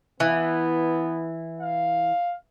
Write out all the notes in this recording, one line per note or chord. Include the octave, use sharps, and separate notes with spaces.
E3 B3
F5